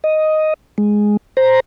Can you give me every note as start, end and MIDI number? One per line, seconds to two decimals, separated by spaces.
0.04 0.54 75
0.78 1.17 56
1.37 1.60 72
1.37 1.60 82